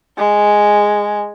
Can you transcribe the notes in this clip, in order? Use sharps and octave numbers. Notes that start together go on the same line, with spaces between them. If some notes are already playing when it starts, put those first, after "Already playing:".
G#3